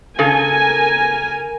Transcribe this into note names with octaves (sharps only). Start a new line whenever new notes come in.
C#3 A4 A#4 G#5